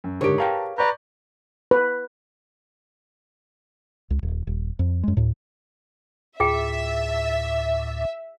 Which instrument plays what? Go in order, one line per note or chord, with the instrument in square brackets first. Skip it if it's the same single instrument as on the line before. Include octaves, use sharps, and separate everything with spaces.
[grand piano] F#2
[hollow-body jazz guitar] C#2 D3 [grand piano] G#2 D7 [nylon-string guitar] G4 A#4 C#5
[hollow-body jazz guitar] G#4 F5 G5 [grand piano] B4 A5 A#5
[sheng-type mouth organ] B4 A#5 [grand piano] D5 C#6 G6
[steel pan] B4
[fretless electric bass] C#2
D#1
D#1
F2
F#2 G#3
D2 A2
[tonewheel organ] D2 A2 [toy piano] F4 G#4 G5 [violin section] E5